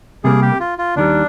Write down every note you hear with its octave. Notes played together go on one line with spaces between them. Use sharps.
C3 G3 A#3 G#4
G4
F4
F4
D#2 D#3 G3 D4